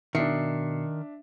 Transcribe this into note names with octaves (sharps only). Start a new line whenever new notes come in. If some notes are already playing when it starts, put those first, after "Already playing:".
B2 D#3 D4 E5 C7 C#7